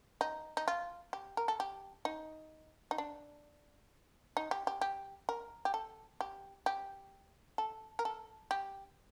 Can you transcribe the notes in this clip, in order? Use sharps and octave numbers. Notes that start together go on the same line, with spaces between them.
D#4
D#4
F4
G4
A#4
A4
G4
D#4
D#4
D4
D#4
G4
G4
G4
A#4
G4
A4
G4
G4
A4
A#4
A4
G4